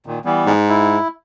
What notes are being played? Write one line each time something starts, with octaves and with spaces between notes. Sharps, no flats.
A#2 D#3
E3 G3 B3
G#2
E4